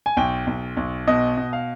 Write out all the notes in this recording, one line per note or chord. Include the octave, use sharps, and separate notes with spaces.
G#5
B1 G5
B1
B1
B2 D#5
B2
F5